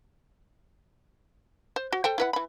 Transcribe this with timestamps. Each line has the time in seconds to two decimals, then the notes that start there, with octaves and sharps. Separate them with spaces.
1.76 C5
1.93 F#4
2.04 A4 C5 G5
2.18 E4 B4 F#5
2.33 E3 B5